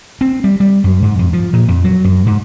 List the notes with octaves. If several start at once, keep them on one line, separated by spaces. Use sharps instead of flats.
C4
G3
G3
F#2
G#2
F2
F3
A#2
F2
F#3
F#2
G#2